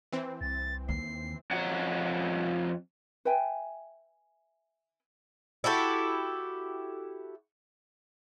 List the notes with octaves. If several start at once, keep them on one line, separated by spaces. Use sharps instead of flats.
E3 C4
C2 A6
D#2 C7
F2 C#5 F#5
B4 E5 G5 G#5
E4 F#4 G4 A4